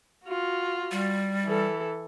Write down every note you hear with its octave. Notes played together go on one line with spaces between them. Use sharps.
F4 F#4
G3
E3 A4